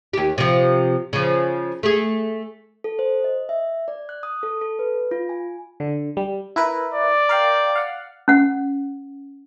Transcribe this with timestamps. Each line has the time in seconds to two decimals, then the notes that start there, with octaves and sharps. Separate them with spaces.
0.13 D#2 G4
0.38 C3 F3
1.13 C#3 F3
1.83 A3 G#4
2.84 A4
2.99 C5
3.24 D#5
3.49 E5
3.88 D5
4.09 F#6
4.23 D#6
4.43 A4
4.61 A4
4.79 B4
5.11 F4
5.29 G#5
5.80 D3
6.17 G3
6.56 E4 A#4 B4
6.94 D5
7.29 A#4 F5 G5
7.76 F5 F#5
8.28 C#4 F#5